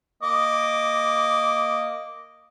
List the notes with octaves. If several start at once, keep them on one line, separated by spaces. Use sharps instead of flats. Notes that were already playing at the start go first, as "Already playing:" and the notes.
A#3 D#5 D6